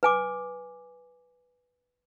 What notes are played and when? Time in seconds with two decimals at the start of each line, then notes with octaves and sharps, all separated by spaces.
0.03 B4 G#5 D6